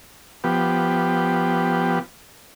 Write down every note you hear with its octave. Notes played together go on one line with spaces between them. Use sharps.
F3 B3 G4